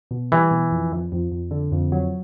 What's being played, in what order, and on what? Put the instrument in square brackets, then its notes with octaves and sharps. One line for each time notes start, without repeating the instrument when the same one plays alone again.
[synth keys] B2
[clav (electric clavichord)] E3 [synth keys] G3
[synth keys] B2
F2
F2
F2
F2
D3
F2
F#3